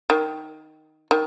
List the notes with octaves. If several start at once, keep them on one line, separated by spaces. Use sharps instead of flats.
D#3
D#3